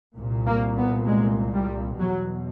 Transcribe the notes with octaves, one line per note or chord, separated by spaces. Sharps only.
C2 A#2
A#3
B3
G#3
G3
E2 B2 F#3